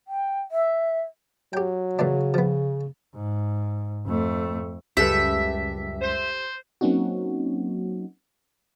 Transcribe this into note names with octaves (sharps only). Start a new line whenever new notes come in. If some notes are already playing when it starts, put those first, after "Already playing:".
G5
E5
F#3 G4 G5
A#2 C#3 E3 D4
F3 B3
G#2
F2 A3
C#2 F#2 G3 G4 A4 B4 E5
C5
F#3 A#3 C4 C#4 D#4 F#4